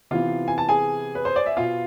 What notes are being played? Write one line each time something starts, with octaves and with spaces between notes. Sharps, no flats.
C3 E3 B3 F4 F5
G#5
A5
G#4 G#5
B4
C5
D5
E5
B2 B3 F4 F5